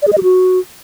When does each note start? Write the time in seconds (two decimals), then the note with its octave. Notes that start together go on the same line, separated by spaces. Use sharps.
0.02 D5
0.07 G#4
0.13 D#5
0.18 G4
0.23 F#4